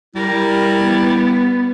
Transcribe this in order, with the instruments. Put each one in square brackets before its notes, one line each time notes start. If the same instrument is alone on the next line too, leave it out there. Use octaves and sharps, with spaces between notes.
[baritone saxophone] G3 [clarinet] E4 [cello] A#4
[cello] B3